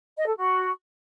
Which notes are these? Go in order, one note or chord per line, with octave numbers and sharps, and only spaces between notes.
D#5
A4
F#4